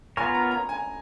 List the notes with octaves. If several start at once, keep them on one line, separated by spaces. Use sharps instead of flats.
B3 F4 A#4 C#5 G#5
A#5
A#5
G#5